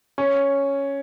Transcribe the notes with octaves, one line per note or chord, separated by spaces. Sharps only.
C#4